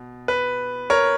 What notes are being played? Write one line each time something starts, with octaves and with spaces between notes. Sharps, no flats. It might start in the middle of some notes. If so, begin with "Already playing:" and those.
Already playing: B2
B4
A#4 C#5